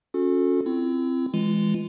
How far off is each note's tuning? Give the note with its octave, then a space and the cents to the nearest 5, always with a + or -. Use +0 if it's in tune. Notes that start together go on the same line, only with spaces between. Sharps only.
C#4 +0 F#4 -40 A4 +0
C4 +0 E4 +40
E3 +0 G#3 +0 F4 -25